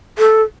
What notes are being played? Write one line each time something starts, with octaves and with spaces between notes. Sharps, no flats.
A4